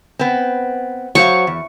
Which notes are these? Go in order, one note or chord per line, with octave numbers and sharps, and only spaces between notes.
B3 C4
F#3 C5 F5 C#6
E2